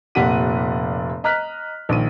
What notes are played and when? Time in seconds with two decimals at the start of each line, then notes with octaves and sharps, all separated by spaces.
0.15 F1 A#2 G4 F#5 B6 D#7
1.24 D#5 A#5 F6 F#6 B6
1.89 A#1 D#3 D#7